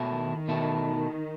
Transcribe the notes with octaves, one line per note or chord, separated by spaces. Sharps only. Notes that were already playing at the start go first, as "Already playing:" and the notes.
Already playing: B2 A3 E4
D#3
B2 A3 E4